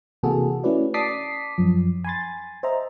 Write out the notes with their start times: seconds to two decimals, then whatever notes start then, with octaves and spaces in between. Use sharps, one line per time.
0.23 C3 E3 A#3 F#4 G#4 A4
0.64 A3 C#4 E4 F#4 B4 D5
0.94 D5 A5 D6 D#6 B6 C7
1.58 F#2 F3
2.04 G#5 B5 C6 A6
2.63 C5 D#5 E5 A#5